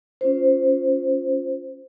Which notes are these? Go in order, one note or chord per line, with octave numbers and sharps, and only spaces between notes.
C#4 F4 C5